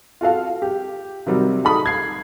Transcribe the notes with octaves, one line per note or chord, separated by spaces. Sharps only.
F4 F#4 A4 F5
G4
C3 D#3 F#3 G3
D#4 A4 B5 D#6
G#6 C7